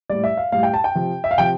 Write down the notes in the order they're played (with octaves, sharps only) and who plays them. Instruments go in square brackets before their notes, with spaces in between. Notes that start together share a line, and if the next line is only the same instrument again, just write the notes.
[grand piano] A2 G3 D5
E5
F5
A2 G3 F5
G5
A5
G5
C3 F3
E5
F5
C3 F3 G5